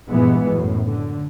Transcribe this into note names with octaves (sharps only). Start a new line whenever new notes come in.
G2 A#2 E3 G#3 B3
F#2 A2
D3